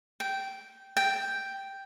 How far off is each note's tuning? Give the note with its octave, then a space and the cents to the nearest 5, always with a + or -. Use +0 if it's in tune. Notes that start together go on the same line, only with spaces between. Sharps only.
G5 -10
G5 +0